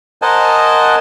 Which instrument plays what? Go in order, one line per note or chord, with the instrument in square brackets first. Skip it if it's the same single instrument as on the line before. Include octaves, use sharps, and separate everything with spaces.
[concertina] A#4 C5 D#5 F#5 G#5 A5